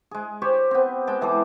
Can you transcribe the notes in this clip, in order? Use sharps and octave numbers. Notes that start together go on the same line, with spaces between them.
G#3 G#4
G4 C5 C#5
B3 C4
G#3 G5 A5
E3 G#3 A4 D6